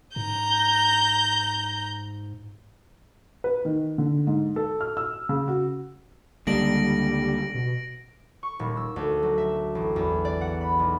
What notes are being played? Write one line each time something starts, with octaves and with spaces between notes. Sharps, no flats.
G#2 A#5 G6
B4
D#3
D3
G#2
A4
F6
E6
C#3
F#4
C#2 D3 G3 A#3 D#4 A#6 D7 F#7
B2
C#6
D#1
E6
D2
F#3
E5
A1
E2
D5
F#5
B5
B1